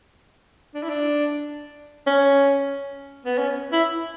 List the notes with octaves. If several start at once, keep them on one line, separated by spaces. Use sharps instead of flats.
D4
E4
D4
C#4
B3
C#4
E4